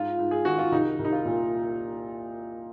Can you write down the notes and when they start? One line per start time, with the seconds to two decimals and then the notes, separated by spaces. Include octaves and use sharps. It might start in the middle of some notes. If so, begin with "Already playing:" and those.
Already playing: G#2 F4
0.19 G#2
0.31 G#4
0.45 D#3 F#4
0.58 F4
0.72 C2 D#4
0.99 C2
1.05 D#4
1.12 F4
1.25 A#2